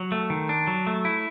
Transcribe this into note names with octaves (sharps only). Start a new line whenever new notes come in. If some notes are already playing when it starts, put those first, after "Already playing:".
Already playing: F#3
A3
D#3
D4
F#3
A3
E4